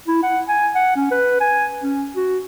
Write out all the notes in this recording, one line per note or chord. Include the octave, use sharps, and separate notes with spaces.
E4
F#5
G#5
F#5
C#4
B4
G#5
C#4
F#4